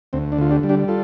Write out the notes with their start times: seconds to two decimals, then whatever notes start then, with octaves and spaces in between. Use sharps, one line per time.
0.13 D2 C4
0.32 D4
0.38 D3 F4
0.51 D4 G4
0.63 G3
0.69 D4 G4
0.88 F4 A4